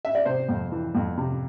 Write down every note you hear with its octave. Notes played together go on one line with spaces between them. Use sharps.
E5
D5
C3 C5
F2
E3
F2
C3